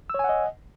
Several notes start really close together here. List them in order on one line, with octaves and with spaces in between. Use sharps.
E6 C#5 G#5 F#5 D#5